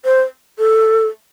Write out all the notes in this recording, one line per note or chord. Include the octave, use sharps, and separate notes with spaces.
C5
A4